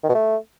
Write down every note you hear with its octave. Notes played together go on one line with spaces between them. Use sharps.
D#3
B2
A3